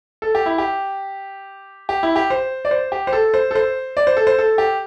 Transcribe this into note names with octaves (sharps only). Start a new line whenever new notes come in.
A4
G4
E4
G4
G4
E4
G4
C5
D5
C5
G4
C5
A4
C5
A4
C5
D5
C5
A4
C5
A4
G4